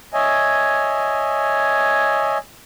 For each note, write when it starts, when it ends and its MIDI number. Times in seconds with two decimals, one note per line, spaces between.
0.14 2.38 73
0.14 2.38 75
0.14 2.38 76
0.14 2.38 80